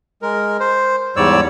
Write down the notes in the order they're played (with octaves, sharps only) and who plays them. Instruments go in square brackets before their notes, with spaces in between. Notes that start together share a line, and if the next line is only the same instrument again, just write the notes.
[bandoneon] G#3 A#4
C5
E2 G#2 G3 C#5 D5 E6